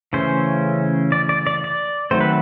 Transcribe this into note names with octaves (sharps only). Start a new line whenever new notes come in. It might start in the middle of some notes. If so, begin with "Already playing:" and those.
C#3 E3 A3 C#4 C5
D5
D5
D5
D5
D#3 F#3 A3 C4 C5
B4